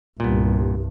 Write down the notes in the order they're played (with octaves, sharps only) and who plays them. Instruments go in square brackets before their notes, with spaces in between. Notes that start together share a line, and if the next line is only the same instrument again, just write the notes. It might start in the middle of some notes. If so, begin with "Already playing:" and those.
[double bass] C2 G2 [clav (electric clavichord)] A#2 B3